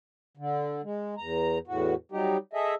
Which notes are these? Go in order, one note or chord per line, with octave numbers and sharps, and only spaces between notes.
D3
G#3
E2 A#5
E2 A2 F#4
F#3 G3 D#4 G4
G#4 A4 D#5 E5